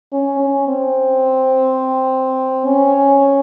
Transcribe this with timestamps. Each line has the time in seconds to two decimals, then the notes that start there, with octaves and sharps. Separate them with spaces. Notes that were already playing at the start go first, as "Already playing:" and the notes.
0.13 C#4
0.40 C#4
0.68 C4
2.66 C#4